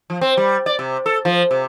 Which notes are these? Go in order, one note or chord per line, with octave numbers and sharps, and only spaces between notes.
F3
C4
G3
D5
C3
A4
F3
C3